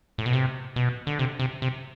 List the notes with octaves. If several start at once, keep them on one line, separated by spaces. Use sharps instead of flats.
A2
B2
C3
B2
D3
C3
C3
C3